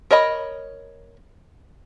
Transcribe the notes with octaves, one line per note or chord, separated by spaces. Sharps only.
A#4 C#5 D#5 B5